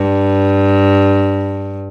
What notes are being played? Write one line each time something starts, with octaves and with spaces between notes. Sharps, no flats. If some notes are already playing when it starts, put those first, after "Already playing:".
Already playing: G2